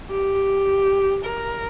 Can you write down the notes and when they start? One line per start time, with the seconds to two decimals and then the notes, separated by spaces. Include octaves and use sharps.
0.10 G4
1.25 A#4